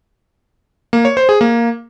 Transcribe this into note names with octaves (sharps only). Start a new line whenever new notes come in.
A#3
C#5
C5
G#4
A#3